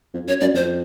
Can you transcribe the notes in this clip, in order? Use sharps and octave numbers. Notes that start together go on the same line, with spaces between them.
F2
F#2 C#5
F#2 D5
F2 C5